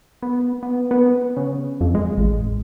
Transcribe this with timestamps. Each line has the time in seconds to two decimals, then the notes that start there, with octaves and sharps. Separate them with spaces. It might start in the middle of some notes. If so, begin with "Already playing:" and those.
0.22 B3
0.63 B3
0.91 B3
1.37 C#3
1.81 F2
1.95 G#3
2.17 A1